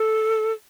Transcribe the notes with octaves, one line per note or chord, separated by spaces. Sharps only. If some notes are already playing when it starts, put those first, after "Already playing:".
Already playing: A4